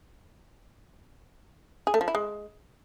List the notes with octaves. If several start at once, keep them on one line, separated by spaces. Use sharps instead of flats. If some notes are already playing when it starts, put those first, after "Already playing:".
G#4
A3
F3
E4
G#3